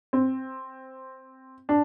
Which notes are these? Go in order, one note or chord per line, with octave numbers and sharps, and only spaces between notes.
C4
D4